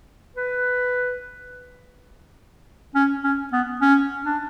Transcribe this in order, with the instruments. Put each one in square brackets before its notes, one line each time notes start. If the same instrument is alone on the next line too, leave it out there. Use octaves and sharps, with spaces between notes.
[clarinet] B4
C#4
C#4
B3
C#4
D4